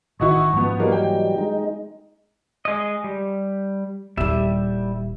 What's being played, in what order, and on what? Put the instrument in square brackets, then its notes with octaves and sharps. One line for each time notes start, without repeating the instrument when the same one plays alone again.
[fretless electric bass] A1 D#3 [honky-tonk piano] E4 F#4 D#5 [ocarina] C#6
[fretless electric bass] G#2 [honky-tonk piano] F3 B3
[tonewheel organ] E3 F#3 G3 [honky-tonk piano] A#3 [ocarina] D#5
[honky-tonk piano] G5
[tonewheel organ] G#3 D#4
[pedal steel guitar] G#3 D#5
G3
[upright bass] D#1 E4 [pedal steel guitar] G3 E5